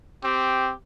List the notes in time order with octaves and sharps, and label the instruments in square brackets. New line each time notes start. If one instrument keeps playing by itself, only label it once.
[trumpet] C4 [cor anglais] G4